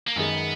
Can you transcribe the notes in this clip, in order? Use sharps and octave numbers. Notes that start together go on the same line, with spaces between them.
A#3
F#2 D#3 G#3 B3